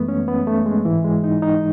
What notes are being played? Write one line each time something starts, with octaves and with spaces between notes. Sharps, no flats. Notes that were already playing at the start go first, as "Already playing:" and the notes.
Already playing: F#2 E3 G#3 A3 B3
C#4
B3
A3
G#3
G#2 E3
G#3
D#4
D#4